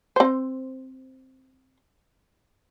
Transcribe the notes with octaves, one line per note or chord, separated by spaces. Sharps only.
C4 C5